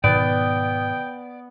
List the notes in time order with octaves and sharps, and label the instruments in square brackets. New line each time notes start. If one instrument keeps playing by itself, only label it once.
[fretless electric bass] G#2 B2 D#3 [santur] B3 [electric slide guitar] D5 [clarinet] G5